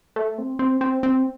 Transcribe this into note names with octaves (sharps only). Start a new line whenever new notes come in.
A3
C4
C4
C4
C4